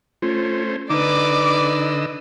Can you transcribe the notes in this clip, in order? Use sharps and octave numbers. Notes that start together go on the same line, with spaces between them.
A3 C#4 F4 C5
D3 D#4 B4 D5 D#5 D6 E6